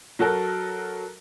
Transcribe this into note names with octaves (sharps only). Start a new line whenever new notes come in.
F#3 F#4 A4 A#4